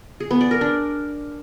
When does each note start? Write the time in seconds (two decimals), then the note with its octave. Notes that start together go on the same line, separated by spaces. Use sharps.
0.20 G#4
0.31 B3
0.41 D5
0.51 A#4
0.61 D4